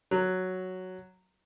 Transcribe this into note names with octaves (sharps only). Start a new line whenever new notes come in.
F#3